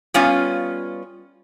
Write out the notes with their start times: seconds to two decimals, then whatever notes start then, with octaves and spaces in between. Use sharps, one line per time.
0.14 G3 B3 C#4 F4 F5